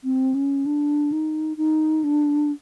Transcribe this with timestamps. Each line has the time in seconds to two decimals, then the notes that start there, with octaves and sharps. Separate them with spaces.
0.04 C4
0.34 C#4
0.66 D4
1.12 D#4
1.57 D#4
2.04 D4